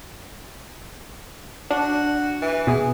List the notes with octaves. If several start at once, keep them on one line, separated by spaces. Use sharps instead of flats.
D4 F#4
E3
B2 G#4